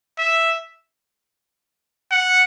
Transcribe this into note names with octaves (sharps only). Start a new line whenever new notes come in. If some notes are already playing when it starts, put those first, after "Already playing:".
E5
F#5